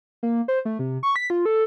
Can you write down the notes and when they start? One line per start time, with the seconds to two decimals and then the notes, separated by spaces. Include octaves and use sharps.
0.23 A#3
0.48 C5
0.65 A3
0.79 C3
1.03 C#6
1.16 B6
1.30 F4
1.46 A4